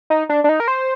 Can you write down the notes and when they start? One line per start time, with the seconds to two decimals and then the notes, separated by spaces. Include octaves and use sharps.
0.10 D#4
0.29 D4
0.44 D4
0.49 D#4
0.60 A#4
0.68 C5